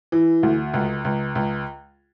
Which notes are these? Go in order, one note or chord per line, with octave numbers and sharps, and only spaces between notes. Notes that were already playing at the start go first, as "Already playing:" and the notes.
E3
D2
C#2
C#2
C#2